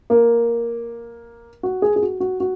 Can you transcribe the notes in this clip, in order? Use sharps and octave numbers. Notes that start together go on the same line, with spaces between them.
A#3
F#4
G#4
G#4
F#4
F#4
F#4